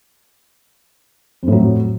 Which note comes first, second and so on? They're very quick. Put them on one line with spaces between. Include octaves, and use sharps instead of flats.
F2 A2 F#3